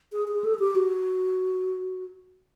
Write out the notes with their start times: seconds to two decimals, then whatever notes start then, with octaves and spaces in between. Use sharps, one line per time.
0.13 G#4
0.28 G#4
0.44 A4
0.54 G#4
0.59 G4
0.75 F#4